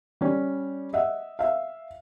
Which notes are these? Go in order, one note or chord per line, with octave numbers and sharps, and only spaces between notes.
G3 C#4
D#5 E5 F#5
E5 F5